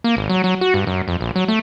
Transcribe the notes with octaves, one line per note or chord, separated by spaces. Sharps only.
A#3
G#1
F#3
F#3
F#4
G2
F#2
F2
A#1
F#3
A3